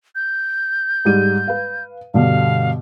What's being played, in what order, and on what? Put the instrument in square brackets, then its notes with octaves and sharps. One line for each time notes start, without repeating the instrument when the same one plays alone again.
[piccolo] G6
[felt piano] G#2 G3 D#7
B4 F5
[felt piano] G2 B2 D3 [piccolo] F5